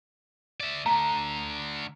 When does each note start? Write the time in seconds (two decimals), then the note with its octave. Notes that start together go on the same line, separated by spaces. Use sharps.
0.60 D5 E5
0.86 D3 A3 A#5